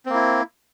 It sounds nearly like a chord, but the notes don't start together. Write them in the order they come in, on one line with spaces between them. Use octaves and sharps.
C4 A#3 E4